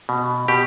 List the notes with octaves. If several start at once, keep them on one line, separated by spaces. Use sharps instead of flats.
B2
B2 G4